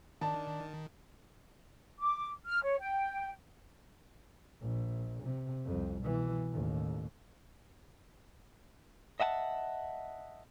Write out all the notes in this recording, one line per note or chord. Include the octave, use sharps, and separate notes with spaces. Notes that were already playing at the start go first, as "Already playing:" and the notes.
D#3 D4 A5
D6
F6
C#5
G5
A#1
C3
C2 F2
B2 E3
A1 D#2
D#5 E5 F#5 G#5 A5